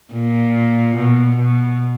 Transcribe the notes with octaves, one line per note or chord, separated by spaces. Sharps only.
A#2
B2
B2